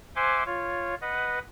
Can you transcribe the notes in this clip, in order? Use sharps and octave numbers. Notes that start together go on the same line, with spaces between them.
C5 E5 F#5 G#5 C6 D6
F4 C#5
B4 D#5 F#5